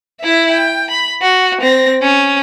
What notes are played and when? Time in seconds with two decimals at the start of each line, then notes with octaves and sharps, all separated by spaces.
0.21 E4 E5
0.50 G5
0.90 B5
1.21 F#4
1.61 C4 A#6
2.02 C#4